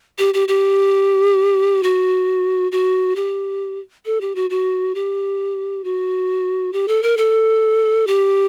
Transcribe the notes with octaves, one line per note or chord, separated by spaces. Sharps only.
G4
G4
G4
F#4
F#4
G4
A4
G4
F#4
F#4
G4
F#4
G4
A4
A#4
A4
G4